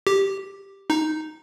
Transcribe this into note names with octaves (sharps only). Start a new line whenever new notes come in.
G4
D#4